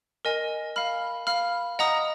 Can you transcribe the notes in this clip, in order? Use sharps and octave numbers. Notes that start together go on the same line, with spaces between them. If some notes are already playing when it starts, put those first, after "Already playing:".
A#4 D#5 G#5
F5 B5 F6
F5 B5 F6
D#5 F#5 A#5 D#6